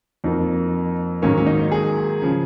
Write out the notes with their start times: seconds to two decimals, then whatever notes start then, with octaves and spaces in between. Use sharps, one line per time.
0.24 F2 F3 A#3 D#4
1.22 G#2 D#3 F#3 A#3 C#4
1.37 C#4
1.47 D#4
1.72 G#4
2.22 C#3 F3